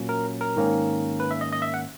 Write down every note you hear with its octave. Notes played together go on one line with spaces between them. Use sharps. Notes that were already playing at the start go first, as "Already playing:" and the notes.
Already playing: A#2 F#3 A#3 C#4
A#4
A#4
G#2 D#3 A#3 C#4
B4
E5
D#5
D#5
E5
F#5